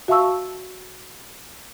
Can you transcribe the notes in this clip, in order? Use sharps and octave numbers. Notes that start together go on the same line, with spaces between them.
F#4 E5 F5 A5 C#6 E6